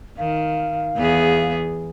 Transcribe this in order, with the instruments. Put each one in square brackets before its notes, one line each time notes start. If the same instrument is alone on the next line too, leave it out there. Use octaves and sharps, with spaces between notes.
[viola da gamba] D#3 [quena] F5
[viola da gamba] E2 B3 G#4